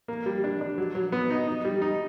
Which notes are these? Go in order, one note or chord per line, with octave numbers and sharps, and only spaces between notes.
A#3
G3
D4
D4
F#3
F#3
B3
D#4
D#4
G3
D#4